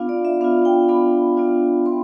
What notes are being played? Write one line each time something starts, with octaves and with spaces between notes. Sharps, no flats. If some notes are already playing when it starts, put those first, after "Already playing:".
Already playing: B3 D4 F4 F5
D5
E5
B3 D4 F4 F5
G5
B3 D4 F4 B5
B3 D4 F4
B3 C6